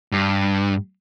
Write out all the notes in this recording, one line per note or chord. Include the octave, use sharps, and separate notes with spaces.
G2